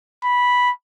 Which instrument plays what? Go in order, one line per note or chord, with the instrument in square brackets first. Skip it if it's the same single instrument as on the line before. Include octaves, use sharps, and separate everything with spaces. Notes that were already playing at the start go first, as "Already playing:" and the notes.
[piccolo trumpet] B5